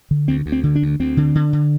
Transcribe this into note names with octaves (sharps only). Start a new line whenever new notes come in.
D3
D2 C4
D2
C4
D3
D4
D2
D2 C4
D3
D3
D3